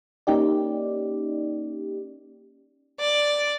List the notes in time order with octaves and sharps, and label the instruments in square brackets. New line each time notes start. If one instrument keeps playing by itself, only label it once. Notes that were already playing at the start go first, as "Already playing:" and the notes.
[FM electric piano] A#3 C#4 D#4 G4 D5
[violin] D5